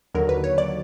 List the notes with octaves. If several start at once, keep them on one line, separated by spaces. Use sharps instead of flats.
D#2 D3 F#3 A#4
B4
C#5
D5